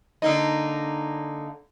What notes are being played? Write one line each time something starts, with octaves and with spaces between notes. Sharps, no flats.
D3 A#3 D#4